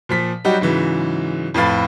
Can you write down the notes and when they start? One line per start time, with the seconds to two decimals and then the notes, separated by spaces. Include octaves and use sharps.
0.09 A#2 F3 B6
0.44 F#3 G3 D#4 F#4 G4
0.61 G#2 C#3 E3 F#3
1.54 F2 A2 B4 F5 A6